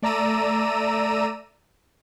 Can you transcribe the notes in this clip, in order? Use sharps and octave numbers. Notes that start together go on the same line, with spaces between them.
A3 D5 A#5 E6 D#7